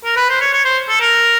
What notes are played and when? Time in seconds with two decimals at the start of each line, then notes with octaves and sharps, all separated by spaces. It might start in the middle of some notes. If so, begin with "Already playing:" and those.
0.05 A#4
0.16 B4
0.29 C5
0.41 C#5
0.53 C#5
0.65 C5
0.89 A4
1.00 A#4